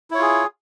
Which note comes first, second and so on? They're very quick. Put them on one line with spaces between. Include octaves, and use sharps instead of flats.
E4 C#5 F4 G#4